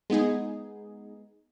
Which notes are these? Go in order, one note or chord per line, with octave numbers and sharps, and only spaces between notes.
G#3 B3 D#4 G#4